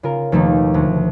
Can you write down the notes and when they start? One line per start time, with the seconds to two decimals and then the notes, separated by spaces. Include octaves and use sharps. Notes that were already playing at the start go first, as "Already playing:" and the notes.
0.03 C#3 F4 A#4
0.32 D#2 B2 F3 A3 A#3 D#4
0.74 D2